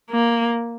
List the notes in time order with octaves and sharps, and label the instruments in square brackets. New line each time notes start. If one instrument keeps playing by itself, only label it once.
[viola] A#3